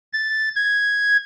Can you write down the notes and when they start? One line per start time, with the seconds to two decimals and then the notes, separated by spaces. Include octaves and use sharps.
0.13 A6
0.56 G#6